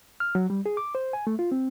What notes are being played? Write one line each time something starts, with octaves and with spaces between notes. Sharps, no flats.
F6
F#3
G3
G#4
D6
C5
G#5
A3
F4
C4